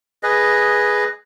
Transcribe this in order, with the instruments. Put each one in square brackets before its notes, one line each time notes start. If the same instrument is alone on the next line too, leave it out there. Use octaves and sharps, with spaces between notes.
[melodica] G#4 B4 D#5